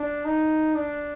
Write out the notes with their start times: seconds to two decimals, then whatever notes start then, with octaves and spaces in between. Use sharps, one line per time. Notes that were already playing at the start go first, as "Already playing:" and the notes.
Already playing: D4
0.25 D#4
0.75 D4